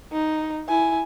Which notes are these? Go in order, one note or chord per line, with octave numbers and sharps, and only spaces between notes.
D#4
E4 G#5